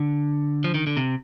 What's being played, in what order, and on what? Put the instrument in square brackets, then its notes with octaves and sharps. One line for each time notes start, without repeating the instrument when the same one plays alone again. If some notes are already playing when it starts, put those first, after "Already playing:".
Already playing: [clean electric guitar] D3
F3
D#3
D3
C3